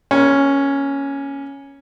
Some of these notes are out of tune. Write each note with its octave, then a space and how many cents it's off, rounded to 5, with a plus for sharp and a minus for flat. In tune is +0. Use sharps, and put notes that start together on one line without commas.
A#3 +30 C#4 +0